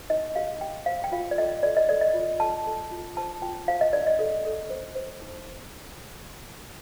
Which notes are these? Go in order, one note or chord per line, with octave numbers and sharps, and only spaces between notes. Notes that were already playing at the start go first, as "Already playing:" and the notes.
D#4 D#5
G4 F5
G4 G5
C5 F5
G5
F4 F5
D5
A4 D#5
A4 D5
D#5
A4 D5
D#5
F4
A4 A5
A4
F4
C5 A5
F4 G5
C5 F5
D#5
D4 D5
D#5
A4
A4
C5
C5
D#4